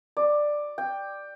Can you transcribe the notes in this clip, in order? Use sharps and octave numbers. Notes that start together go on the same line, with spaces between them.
D5
G5